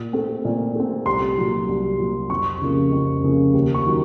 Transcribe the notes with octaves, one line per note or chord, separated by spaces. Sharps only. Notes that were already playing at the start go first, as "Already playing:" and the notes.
Already playing: A#2
A3 C4
A#2
A3 C4
C2 C6
A#2 F#3
C2
A#2 F#3
F2 C#6
C#3 F3 A#3
F2
C#3 F3 A#3
D#2
C#6
D#3 F#3